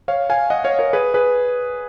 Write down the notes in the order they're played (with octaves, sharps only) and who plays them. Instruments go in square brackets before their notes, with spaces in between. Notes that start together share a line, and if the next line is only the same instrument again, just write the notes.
[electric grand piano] C#5 F5
F5 G#5
D#5 F#5
C#5 F5
A#4 C#5
G#4 B4
G#4 B4